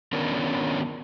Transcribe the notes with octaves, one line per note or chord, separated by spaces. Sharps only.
D#3 B3 C#4 D4 A#4 C#5